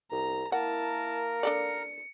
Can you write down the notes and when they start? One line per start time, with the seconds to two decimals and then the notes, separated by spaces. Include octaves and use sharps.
0.12 C2 A#5
0.52 A#3 E4 A#4 F#5 A5
1.43 D4 A4 D5 C#7